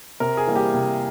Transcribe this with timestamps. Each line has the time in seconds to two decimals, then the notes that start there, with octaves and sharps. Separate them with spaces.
0.20 C3 A#4
0.37 G#4
0.47 E3 G3 A#3
0.56 G4
0.74 C3